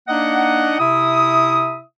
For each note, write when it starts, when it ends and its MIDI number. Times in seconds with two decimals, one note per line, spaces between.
0.08 0.75 58
0.08 0.75 62
0.08 0.75 63
0.08 0.75 75
0.08 0.75 78
0.79 1.81 48
0.79 1.81 64
0.79 1.81 76
0.79 1.81 87